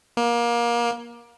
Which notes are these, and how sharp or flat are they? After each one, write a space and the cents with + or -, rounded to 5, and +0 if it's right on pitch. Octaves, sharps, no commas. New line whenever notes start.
A#3 +25